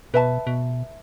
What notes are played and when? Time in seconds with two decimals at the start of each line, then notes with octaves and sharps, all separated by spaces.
0.14 B2 B4 E5 A5
0.47 B2